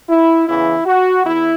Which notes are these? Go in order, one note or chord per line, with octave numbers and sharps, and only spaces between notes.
E4
E2 C#3 E3 E4
F#4
E2 E4